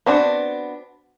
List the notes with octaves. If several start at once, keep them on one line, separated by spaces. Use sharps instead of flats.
B3 C4 D4 F#4